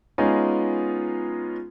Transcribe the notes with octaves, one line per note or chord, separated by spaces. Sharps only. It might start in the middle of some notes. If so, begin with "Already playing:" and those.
G#3 B3 C#4 D#4 F4